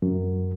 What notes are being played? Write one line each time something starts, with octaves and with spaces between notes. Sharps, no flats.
F#2